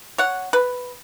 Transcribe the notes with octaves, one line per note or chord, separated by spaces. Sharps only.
C#5 F#5
B4